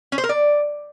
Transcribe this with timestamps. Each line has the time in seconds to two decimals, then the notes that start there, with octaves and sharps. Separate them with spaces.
0.12 C#4
0.18 C5
0.24 A#4
0.29 D5